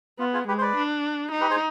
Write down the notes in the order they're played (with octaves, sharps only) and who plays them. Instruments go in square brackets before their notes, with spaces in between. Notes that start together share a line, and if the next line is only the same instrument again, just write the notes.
[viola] B3 [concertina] F4
[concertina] F4 G#4
[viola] G#3 [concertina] G4 B4
[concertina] C5
B4 D5
[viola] D4
D#4
[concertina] G4 B4
G#4 C5